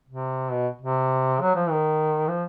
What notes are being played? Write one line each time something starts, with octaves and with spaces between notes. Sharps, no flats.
C3
B2
C3
F#3
F3
D#3
F3